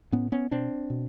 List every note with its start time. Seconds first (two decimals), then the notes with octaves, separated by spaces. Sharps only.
0.12 A2 B3 C#4
0.32 B3 C#4
0.51 B2 C4 D4
0.90 B2